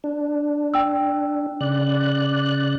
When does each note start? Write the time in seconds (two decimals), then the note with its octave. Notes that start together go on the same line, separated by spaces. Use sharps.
0.04 D4
0.74 G5 E6
1.61 C#3 D5 F#6